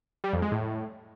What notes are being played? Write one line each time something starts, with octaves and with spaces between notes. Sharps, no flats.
G3
F2
G#3
A2